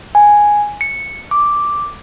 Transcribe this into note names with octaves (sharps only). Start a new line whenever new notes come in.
G#5
C#7
D6